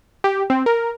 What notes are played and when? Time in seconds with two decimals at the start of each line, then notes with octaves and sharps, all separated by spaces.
0.24 G4
0.50 C4
0.66 A#4